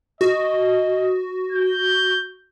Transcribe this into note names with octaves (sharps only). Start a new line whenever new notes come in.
F#4 D#5
G6